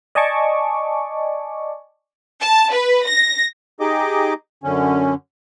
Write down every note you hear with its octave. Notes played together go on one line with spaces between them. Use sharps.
D5 D#5 G#5 A5 C#6 D6
A5
B4
A#6
D#4 G4 G#4 D#5 D6
F#2 D3 C#4